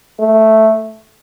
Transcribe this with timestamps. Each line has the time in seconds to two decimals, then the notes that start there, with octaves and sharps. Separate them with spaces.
0.20 A3